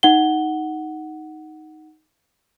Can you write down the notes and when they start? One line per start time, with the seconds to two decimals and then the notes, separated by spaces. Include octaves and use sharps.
0.03 D#4 F#5 G7